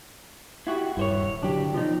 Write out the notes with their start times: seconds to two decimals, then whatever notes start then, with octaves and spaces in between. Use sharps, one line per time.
0.67 E4 F#4 G4
0.97 D#1 G2 E4 C5 C#5
1.43 D3 F#3 D4 G4
1.74 B2 F3 D#4